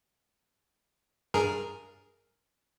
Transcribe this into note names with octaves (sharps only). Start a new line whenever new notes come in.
G2 G#4 A#4